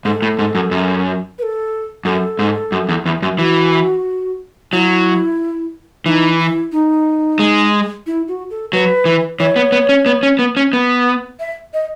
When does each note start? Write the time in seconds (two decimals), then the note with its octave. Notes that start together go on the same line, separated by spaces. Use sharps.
0.05 G#2 A4
0.22 A2
0.39 G#2
0.55 F#2
0.71 F#2
1.38 B4
1.43 A4
2.05 F#2 A4
2.39 G#2
2.72 F#2
2.89 E2
3.06 E2
3.22 F#2
3.39 E3 F#4
4.72 F#3 E4
6.06 E3 D#4
6.38 E4
6.72 D#4
7.39 G#3
8.06 E4
8.28 F#4
8.50 A4
8.73 F#3 B4
9.05 E3
9.39 E3 C#5
9.56 B3
9.72 B3
9.89 C#4
10.06 B3
10.23 C#4
10.39 B3
10.57 C#4
10.73 B3
11.39 E5
11.74 D#5